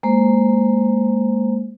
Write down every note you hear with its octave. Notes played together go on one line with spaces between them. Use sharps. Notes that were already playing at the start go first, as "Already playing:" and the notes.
G#3 A#3 C5